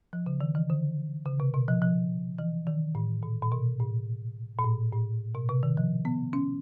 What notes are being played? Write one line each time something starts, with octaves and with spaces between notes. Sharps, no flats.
F3
C#3
D#3
E3
D3
C#3
C3
B2
F3
F3
E3
D#3
A2
A#2
A#2
B2
A2
A#2
A2
A2
B2
C3
D#3
F3
B3
C#4